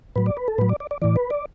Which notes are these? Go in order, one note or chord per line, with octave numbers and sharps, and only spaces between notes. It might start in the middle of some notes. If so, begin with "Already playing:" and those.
A2 F#3 B4
D5
B4
A4
A2 F#3 B4
D5
D5
D5
A2 E3 D5
B4
D5